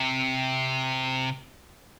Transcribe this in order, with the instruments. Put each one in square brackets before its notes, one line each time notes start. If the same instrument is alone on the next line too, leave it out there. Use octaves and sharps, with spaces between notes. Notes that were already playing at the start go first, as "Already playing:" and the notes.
Already playing: [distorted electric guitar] C3